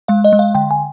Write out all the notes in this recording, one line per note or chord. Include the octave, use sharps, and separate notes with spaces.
G#3 F5
D#5
G#3
F5
D3 G5
G#5